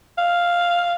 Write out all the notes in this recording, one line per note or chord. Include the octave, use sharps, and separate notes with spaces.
F5